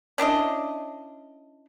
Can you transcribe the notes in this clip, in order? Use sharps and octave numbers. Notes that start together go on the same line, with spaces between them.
C#4 D4 E4 D#5